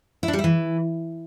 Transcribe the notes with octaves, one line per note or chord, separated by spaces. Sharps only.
E4
D4
G3
E4
E3